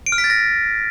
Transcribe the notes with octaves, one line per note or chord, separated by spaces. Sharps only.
D7
F6
B6
A6
A#6